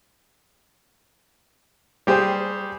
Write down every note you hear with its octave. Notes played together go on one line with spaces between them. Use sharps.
G3 G4 G#4 C5